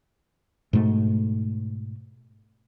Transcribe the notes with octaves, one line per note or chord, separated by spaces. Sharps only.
G#2 B2 A3